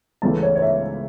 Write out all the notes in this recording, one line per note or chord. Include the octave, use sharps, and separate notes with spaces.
C#2 C#3 E3 A3 A5
C#5
C#5
E5